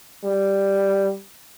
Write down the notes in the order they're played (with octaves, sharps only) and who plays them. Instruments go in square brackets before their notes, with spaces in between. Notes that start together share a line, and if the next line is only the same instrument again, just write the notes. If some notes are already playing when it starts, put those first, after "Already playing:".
[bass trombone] G3